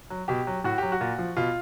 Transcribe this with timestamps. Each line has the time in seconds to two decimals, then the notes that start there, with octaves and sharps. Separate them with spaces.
0.10 F#3
0.28 B2 G4
0.47 F#3
0.64 A2 F#4
0.78 F#3 G4
0.92 F#4
1.01 A#2
1.18 F3
1.37 B2 F4